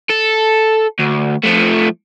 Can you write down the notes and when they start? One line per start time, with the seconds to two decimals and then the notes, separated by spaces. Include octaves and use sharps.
0.10 A4
0.99 D2
1.44 F3 A3